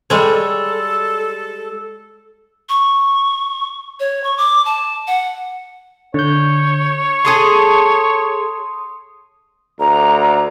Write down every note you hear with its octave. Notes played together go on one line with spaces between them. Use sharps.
G3 G#3 A4 C#5
C#6
C#5
C#6
D6
A5
F#5
D3 C#5 G6
G#4 A4 A5 C6 D#6
D2 A#5